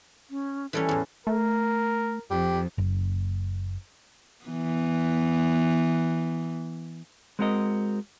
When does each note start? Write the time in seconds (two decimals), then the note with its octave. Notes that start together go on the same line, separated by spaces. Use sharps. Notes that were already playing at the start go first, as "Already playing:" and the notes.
0.30 C#4
0.73 E3 G3 C#4 A4
0.89 E2 A2
1.27 A3 A#4
2.31 F2 G4
2.78 F#1
4.45 E3 B3
7.39 G#3 C4 F#4 A#4 D#5